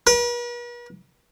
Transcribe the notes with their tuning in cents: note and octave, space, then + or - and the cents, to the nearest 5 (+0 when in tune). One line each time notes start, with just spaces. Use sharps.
B4 -45